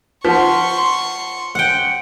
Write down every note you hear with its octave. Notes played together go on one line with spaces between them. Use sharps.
F3 F#5 A5 C6 C#6 B6
F#5 G5